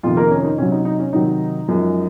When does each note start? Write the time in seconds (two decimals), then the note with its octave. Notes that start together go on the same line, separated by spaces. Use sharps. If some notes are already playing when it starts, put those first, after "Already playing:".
0.03 F2 C3 D#3 F3 F4
0.17 A#3 A#4
0.31 C#4
0.44 D#4
0.58 C3 F#3 C#4
0.72 D#4
0.85 D#4
0.99 C#4
1.13 C3 D#3 F#3 D#4
1.68 F#2 F3 G#3